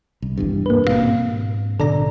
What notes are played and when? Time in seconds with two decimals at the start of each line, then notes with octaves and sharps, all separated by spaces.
0.22 C2
0.38 G#1 E2 G2
0.66 A#3 B4
0.87 B2 C4 F5
1.06 G#2
1.80 B2 D3 A4 D5 A#5